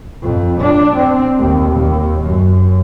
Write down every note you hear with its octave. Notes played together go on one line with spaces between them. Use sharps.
F2
D4
C4
D#2
D#2
F#2